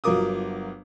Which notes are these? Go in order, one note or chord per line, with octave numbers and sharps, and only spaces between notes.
G1 F#3 F4 A#4 D6 D#6